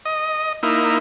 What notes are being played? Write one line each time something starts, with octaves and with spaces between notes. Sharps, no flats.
D#5
A#3 D#4 E4